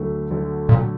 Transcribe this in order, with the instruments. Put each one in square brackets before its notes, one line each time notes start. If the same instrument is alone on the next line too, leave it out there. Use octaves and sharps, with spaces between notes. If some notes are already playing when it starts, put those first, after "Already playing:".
Already playing: [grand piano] D2 D3 F#3 A3
D2 D3 F#3 A3
[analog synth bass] A#2 [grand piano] D3 F#3 A3